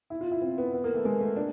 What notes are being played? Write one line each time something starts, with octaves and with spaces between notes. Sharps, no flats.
E4
F4
E4
C4
B3
B3
A#3
A3
G#3
A3
D4